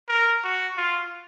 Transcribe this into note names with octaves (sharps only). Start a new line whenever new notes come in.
A#4
F#4
F4